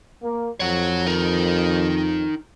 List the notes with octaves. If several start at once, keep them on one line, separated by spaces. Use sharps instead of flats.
A#3
F2 C#5 F#5
D#4 A#4